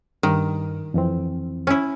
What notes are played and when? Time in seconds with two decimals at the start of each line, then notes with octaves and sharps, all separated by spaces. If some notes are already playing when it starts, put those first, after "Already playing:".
0.23 G2 D#3
0.94 F2 E3 C4
1.67 C#4 E4